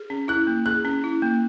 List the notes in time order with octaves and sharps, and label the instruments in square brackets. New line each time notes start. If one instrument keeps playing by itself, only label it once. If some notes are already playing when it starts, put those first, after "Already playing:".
Already playing: [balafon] G#4
C#4
[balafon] E4 [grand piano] F#6
[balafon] A#3
[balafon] G#4 [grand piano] F#6
[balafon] C#4
E4
A#3